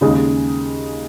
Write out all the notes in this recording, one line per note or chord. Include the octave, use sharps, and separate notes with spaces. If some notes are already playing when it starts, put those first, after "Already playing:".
D#2 C#3 G#3 D#4 G#4